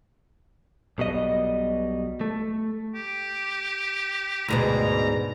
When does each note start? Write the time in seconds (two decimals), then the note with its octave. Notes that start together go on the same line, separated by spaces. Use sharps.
0.98 B1 B2 G3 D#5
2.21 A3
2.95 G4
4.48 D2 G#2 B2 A#5